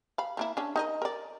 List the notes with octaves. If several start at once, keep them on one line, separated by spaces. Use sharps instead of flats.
F5 B5
F3 A#3 E4
C#4 D4
D#4 A#4 D#5
A#4 D5